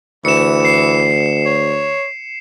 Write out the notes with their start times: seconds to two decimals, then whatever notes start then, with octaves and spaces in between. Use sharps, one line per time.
0.25 D2 E3 C#7 E7
0.65 C7
1.46 C#5